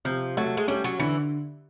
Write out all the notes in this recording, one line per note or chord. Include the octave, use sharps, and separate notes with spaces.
C3 F3
F#3 A3
G#3
G3 C#4
F#3
D3 E3